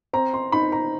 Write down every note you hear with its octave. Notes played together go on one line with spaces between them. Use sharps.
C4 A#5
C6
D#4 B5
A#5